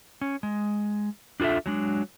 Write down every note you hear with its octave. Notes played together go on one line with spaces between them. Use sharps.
C#4
G#3
D4 F4 G#4 A4 E5
F#3 G#3 D4